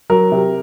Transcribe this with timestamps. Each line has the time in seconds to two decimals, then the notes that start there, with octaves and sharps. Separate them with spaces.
0.10 F#3 A#4
0.32 C3